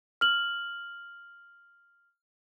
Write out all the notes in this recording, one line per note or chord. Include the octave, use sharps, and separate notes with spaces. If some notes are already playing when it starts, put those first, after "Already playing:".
F6 F#7